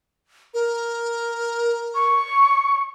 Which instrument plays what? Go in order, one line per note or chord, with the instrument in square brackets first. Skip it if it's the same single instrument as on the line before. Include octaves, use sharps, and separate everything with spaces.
[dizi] A#4
[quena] C#6